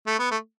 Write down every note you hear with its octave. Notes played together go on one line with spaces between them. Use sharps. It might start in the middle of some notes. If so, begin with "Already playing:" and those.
A3
B3
A3